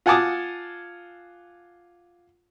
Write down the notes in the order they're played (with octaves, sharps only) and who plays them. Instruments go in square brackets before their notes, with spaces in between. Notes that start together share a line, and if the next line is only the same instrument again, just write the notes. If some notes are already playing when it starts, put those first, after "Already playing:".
[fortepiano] F4 F#5 G#5 A5 D6 D#6